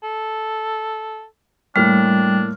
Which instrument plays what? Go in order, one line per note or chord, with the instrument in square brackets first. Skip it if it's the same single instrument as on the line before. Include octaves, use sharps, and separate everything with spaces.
[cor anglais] A4
[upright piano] A2 A#3 F6 [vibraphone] G3 [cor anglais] D4